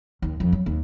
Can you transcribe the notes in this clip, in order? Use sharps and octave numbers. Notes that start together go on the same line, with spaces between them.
D#2
F2
F#3
D#2